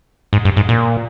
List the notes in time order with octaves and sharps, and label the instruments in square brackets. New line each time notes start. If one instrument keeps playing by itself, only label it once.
[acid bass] G#2
G2
G#2
A#2